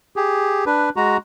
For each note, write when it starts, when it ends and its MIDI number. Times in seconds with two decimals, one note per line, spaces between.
0.16 0.65 67
0.16 0.65 68
0.66 0.89 62
0.66 0.89 71
0.96 1.17 56
0.96 1.17 66
0.96 1.17 82